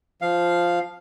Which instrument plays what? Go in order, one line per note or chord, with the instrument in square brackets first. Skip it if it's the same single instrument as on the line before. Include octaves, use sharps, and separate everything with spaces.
[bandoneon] F3 F5